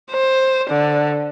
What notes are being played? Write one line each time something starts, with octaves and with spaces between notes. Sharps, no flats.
C5
D3